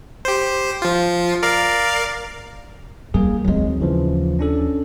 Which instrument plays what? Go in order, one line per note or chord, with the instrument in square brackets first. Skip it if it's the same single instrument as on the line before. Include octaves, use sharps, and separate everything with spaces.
[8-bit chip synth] G4 C5
F3 F4
A#4 D5 F5
[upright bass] F2 G3 [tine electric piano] A#3 G#4
[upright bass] D#2 C4 [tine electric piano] F#3 G#3
[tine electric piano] C#3 E3 F3
C#4 D4 A4